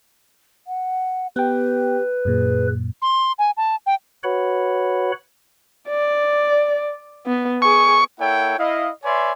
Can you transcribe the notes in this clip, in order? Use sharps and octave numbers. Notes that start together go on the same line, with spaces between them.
F#5
B3 G4 B4 G5
F#2 A#2 G#4
C6
G#5
A5
G5
F#4 B4 C#5 F#5 B5
D5
B3
G#4 C#6
A#3 E4 A4 C#5 F#5 G5
E4 D#5 F5
B4 C#5 D5 E5 G#5 C6